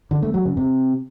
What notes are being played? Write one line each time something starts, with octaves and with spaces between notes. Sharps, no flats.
D3
A3
F#3
C#3
C3